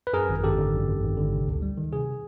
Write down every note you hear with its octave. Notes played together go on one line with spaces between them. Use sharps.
B4
F#2 G#4 A#4
G#1
G#1 G4 A4
D3
F#2
G#1
G#1
D3
C3
D2
G3
D#3
C3 G#4